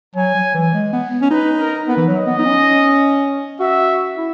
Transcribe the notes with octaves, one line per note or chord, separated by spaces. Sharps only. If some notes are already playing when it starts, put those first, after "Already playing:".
F#3 G#5
F#3
E3
G#3
B3
C#4
D#4 B4
A#4
B3 B4
E3
F#3
D#5
B3
D#4
C#4
F#4 E5
E4